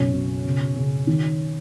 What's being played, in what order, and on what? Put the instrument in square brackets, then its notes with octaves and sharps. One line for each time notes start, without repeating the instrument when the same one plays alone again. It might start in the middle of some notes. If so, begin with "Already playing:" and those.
Already playing: [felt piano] F#1 B1 C#4
B2
C#3
C#3
D#3